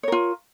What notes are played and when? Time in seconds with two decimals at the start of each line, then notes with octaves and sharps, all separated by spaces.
0.03 C#5
0.08 A#4
0.12 F4